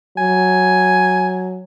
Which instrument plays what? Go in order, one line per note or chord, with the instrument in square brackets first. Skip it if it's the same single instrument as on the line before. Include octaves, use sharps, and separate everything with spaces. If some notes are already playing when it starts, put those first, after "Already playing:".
[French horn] F#3 [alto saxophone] G#5